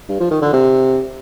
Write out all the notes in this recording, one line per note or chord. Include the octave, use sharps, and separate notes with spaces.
G2
F3
D#3
D3
C3